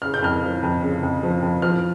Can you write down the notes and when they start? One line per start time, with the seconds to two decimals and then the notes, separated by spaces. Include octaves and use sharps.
0.02 C#3 F6
0.14 G6
0.22 F2 F6
0.43 F3
0.63 F2
0.82 C#3
1.03 F2
1.23 F3
1.42 F2
1.62 F3 F6